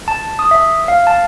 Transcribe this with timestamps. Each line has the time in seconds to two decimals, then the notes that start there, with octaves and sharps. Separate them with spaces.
0.08 A5
0.39 D#6
0.51 E5
0.88 F5
1.07 A5